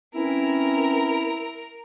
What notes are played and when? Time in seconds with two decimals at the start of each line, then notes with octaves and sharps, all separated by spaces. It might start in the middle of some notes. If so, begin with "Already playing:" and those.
0.15 E3 C4 C#4 E4 A#4